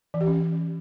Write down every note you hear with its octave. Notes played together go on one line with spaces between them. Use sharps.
E3
G4
C#4